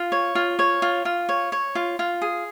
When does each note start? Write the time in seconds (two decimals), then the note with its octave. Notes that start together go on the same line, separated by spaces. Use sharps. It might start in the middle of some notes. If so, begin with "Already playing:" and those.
Already playing: F4
0.12 C#5
0.35 F4
0.59 C#5
0.82 F4
1.05 F4
1.29 C#5
1.52 C#5
1.75 F4
1.99 F4
2.22 G#4